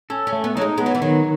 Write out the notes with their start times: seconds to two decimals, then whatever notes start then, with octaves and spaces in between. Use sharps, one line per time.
0.10 C#4 A4
0.27 C#4
0.33 A3
0.44 B3
0.56 F#3 D#4
0.61 G#3
0.78 G#3 B3
0.86 F#3
0.95 E3
1.01 D#3 F#3